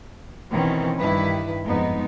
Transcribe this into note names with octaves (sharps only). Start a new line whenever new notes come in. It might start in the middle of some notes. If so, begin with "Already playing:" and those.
B2 D#3 E3 C4 C#4
G2 D#3 E4 B4
F2 G#2 G#3 B3 D#4